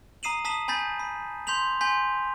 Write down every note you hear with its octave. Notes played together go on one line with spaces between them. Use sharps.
A#5 D#6 C7 D#7 E7 F#7
A5 D#6 B6 E7 F#7
G#5 B5 G6 A6 B6
B5
C6 G6 B6 F7 F#7
G#5 C6 G6 B6